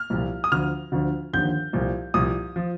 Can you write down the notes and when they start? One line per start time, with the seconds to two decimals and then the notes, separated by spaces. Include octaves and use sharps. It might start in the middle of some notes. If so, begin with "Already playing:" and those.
Already playing: F6
0.10 C2 A#2 F3
0.44 D#6
0.52 D2 D3 F3 F6
0.92 D2 D3 F3
1.33 D#2 D3 F3 G6
1.73 C2 A#2 F3
2.14 C2 A#2 F3 D#6
2.56 F3